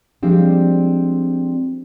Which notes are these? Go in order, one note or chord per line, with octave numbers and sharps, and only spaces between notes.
F3 G3 G#3 C4 D4